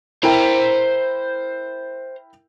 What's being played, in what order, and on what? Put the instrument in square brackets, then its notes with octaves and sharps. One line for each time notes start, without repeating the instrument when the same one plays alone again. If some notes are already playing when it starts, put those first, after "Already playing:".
[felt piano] E4 A#4 G5 [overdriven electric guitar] C5 A#5